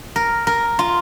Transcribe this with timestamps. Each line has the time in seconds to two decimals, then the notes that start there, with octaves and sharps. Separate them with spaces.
0.16 A#4
0.47 A#4
0.79 F4